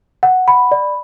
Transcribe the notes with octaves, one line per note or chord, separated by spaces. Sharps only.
F#5
B5
D5